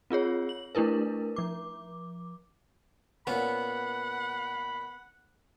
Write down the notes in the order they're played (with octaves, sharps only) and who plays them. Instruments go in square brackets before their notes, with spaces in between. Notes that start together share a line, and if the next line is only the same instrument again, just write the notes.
[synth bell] C4 F4 G#4 C#5
F#7
A3 D4 E4 A#4 B4
F3 D6
[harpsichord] A#2 C#4 [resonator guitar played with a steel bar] B3 [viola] F#5 [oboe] B5